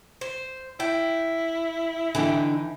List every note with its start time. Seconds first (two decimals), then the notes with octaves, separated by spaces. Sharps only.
0.21 C5
0.80 E4 G5
2.15 D3 E3 D#4 G5